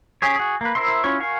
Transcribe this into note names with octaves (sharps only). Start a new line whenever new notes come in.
C#4 G4 G#4 C#5
F#4 G#4
A#3 B4
E4 A#4 C5 E5 C6
C#4 E4 F4 C#5 C#6
F#4 A#4 F5 G#5 C#6